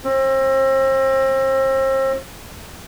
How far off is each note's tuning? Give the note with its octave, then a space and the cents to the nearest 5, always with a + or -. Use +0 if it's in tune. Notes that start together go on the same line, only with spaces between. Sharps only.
C4 +35